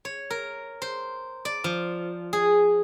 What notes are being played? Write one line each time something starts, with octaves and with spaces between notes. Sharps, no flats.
C#5
A#4
C5
D5
F3
G#4